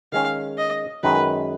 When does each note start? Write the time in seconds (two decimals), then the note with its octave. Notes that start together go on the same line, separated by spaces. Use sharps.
0.12 D#3 G#3 C#4 F5
0.58 D#5
1.03 F#2 D#3 G#3 B4